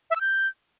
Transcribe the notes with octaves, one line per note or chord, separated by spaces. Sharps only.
E5
E6
G6